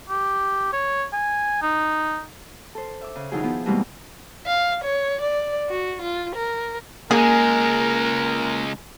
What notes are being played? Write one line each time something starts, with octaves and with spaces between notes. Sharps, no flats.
G4
C#5
G#5
D#4
A4 C5
E5 D6
C#3
D#3 F3 D#4 E4 F#4 G#4
F3 B3 E4
B2 E3 G3 G#3 A#3 C4
F5
C#5
D5
F#4
F4
A#4
C#2 G#3 A#3 G#4 A#4